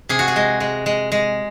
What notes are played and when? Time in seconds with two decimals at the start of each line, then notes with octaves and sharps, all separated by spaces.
0.09 C3 G#4
0.19 F#4
0.28 G#4
0.36 G#3
0.60 G#3
0.86 G#3
1.12 G#3